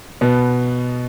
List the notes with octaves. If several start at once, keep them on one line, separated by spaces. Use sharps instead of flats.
B2 B3